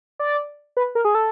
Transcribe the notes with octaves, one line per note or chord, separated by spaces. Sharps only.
D5
B4
A#4
G#4
A4